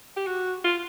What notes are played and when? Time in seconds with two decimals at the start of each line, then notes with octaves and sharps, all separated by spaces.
0.16 G4
0.27 F#4
0.64 F4